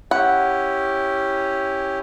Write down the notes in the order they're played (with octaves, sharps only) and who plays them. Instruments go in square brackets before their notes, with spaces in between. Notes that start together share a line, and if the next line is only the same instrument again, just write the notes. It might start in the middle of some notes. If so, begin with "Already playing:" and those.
[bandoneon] C#4 E4 G4 [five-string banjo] F#5